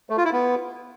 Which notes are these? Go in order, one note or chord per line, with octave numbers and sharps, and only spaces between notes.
A3
F4
E4
B3